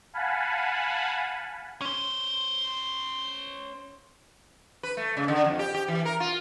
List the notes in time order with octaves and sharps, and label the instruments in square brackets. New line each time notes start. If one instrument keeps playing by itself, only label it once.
[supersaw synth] F5 F#5 G#5 A5 B5
[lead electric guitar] C#4 C5
[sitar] B4
A3
C#3
D3
F2
G4
G4
E3
A#4
F4